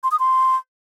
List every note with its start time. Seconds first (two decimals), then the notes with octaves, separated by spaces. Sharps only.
0.03 C6
0.11 D#6
0.19 C6